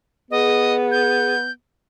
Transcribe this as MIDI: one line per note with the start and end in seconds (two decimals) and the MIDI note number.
0.31 1.51 59
0.31 1.32 68
0.31 0.76 75
0.91 1.51 91